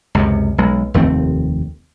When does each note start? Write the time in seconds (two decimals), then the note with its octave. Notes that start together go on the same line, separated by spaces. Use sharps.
0.15 C#2 F#2 C3
0.58 B1 G#3
0.94 F1 D#2 A3 C4